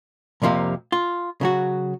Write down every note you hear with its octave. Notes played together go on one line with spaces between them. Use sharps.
C2 F2 C3 F3 A#3 G4
F4
C#3 F#3 F#4